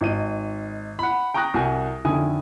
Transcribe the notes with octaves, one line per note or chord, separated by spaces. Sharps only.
G#1 D#4 D#7
F#5 B5
G5 A#5 C#6 D#6 F#6 A#6
C2 F#4 G#5
F2 D3 D#3 E4 G#5 D#6